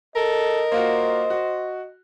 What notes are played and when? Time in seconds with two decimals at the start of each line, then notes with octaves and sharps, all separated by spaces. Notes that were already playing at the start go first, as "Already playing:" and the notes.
0.16 A4 A#4 D#5
0.72 A#3 F4 F#4 C5
1.30 F#4